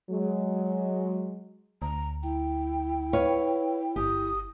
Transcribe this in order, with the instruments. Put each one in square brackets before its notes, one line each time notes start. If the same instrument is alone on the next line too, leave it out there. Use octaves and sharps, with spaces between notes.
[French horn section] F#3 G#3
[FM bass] D2 [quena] A#5
[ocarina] E4 [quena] G5
[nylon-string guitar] B4 C#5 F5
[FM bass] G1 [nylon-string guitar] G4 [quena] D#6